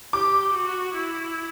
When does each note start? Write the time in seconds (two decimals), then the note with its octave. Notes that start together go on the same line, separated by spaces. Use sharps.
0.13 G4 D6
0.53 F#4
0.94 E4